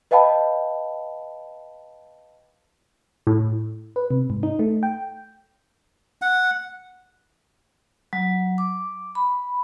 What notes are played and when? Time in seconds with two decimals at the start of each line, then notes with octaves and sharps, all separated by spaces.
0.11 B4 D#5 F5 G5 A5 B5
3.27 A2
3.96 B4
4.11 C3
4.30 G#2
4.43 D#4
4.59 A3
4.83 G5
6.22 F#5
8.13 F#3
8.58 D6
9.15 B5